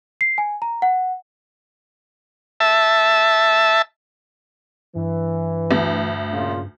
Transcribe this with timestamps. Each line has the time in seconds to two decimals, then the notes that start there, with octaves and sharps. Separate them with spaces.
0.21 C7
0.38 G#5
0.62 A#5
0.82 F#5
2.60 E5 A5
4.96 G2 E3
5.71 D2
6.33 A#2 C#3 F4